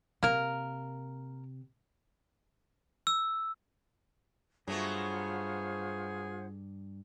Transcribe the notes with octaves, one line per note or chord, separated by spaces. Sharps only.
C3 A#3 A#4
E6
G2 F#3 A3 B3 F4 G#4 C5 F#5